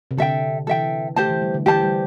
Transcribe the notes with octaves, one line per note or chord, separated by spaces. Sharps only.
C3
D3 A4 E5 G5
E3 A4 E5 G5
A3 G4 C5 A5
E3
G3
D3
E3 G4 C5 A5
G3